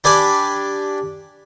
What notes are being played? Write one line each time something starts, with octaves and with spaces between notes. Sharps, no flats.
D4 G4 B4 G#5 D6